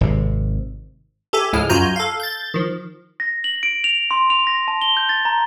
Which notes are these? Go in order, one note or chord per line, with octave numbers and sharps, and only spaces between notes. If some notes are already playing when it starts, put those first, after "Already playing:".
G#1 C3
G4 A4 E5 G#5
C#2 G#2 F3 G#3 E4 F6
F#2 F4 F#4 G#5 A#5 G6
A4 F5
G6 A6
D#3 F3
A#6
F#7
D7
F7
C6
F7
A#6
A5
G7
G6
A6
A#5